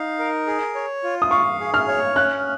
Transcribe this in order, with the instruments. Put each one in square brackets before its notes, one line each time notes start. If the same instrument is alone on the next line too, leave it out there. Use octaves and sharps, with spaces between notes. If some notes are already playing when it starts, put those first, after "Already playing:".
Already playing: [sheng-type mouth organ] D#4 F5
A#4
G#4
C#5
F4
[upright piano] D#6
[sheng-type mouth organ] F5 [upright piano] C#6
[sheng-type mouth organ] G#4
[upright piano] F6
[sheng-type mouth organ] C#5
[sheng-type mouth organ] C#4 [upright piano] F#6